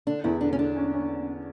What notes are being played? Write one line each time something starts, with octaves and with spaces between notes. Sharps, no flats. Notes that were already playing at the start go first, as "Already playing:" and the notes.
D3 D4
E2 E4
D3 D4
C#4
D3 D4
C#4
C#4